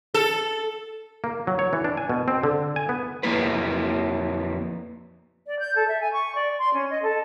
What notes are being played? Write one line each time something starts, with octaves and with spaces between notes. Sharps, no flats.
A4
A#3
F#3
C#5
E3
D4
G#5
B2
C4
D3
G#5
B3
F2 A#3 E4 B4
D5
G6
A4
E5
G#5
C#6
D5
C6
C#4
D#5
A4